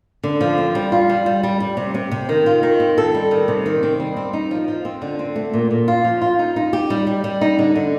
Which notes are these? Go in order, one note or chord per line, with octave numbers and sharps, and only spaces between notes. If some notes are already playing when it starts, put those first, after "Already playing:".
D3
F3
C4
G3
F4
G3
G3
G3
G3
C3
C3
C3
D#3
F4
D#3
C4
A4
G3
D#3
C3
D#3
C4
G3
C4
D#4
F3
F3
C4
D3
C4
A3
A#2
A#2
F4
F3
F4
D#4
D#4
G4
G3
G3
G3
D#4
D3
D3